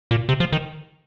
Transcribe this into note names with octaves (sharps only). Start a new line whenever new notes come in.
A#2
C3
F3
D#3